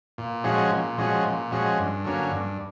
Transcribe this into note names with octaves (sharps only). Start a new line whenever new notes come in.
A#2
F3 G#3 C#4 F#4
A#2
F3 G#3 C#4 F#4
A#2
F3 G#3 C#4 F#4
G2
D3 F#3 A#3 C#4
G2